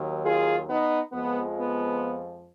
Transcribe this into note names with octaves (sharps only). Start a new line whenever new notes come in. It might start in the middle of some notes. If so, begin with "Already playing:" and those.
Already playing: D#2 D#3 F#3
F4 G#4
B3 D#4
F2 F3 G#3 B3
B3